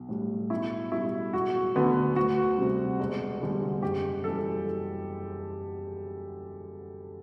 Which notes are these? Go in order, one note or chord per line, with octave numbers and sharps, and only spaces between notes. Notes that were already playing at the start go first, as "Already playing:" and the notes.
Already playing: B1
A2 G3
B1 E4
B2 G3 E4
E1 F#4
D2 D3 F#3 B3
D2 F#4
C3 G3
E1
E2 D3 G3
F#1 G4
F#2 E3 G3 A4